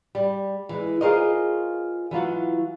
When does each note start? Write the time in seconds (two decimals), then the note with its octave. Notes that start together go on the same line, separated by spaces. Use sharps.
0.15 G3
0.69 E3 G#3
1.01 F4 G#4 A#4 C5 C#5 D#5
2.11 E3 F#3 F4 F#4